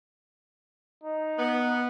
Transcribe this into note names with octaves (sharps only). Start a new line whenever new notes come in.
D#4
B3